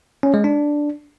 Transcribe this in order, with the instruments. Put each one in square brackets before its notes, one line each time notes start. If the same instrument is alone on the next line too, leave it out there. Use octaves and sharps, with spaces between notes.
[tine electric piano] C#4
G#3
D4